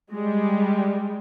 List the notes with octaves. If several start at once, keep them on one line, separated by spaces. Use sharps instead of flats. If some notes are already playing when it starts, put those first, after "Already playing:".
G3 G#3